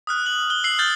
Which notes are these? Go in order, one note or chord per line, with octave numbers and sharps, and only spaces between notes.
D#6 F6 F#6
F#7
F#6 F#7 G7
E6 C7 F#7
F6 G6 A6 G7